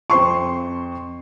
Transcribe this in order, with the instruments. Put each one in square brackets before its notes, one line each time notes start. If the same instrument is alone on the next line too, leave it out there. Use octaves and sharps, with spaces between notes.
[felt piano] F2 C5 C6 C#6